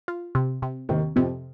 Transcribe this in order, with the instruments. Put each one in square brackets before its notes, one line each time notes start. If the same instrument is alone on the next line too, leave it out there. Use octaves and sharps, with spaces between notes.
[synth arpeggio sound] F4
C3
C3
[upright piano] D#2 D#3 [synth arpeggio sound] C3
[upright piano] F2 F3 [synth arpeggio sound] C3